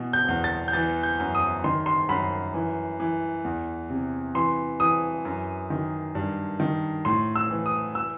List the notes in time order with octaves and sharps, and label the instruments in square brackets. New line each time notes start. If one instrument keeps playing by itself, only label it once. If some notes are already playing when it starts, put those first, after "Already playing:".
Already playing: [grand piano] B2 E3
G6
E2
A6
G6
E3 A6
G6
F#2
D#6
D#3 C6
C6
F#2 B5
E3
E3
E2
C3
E3 C6
E3 D#6
F#2
D#3
G2
D#3
A2 C6
E6
E3
D#6
E6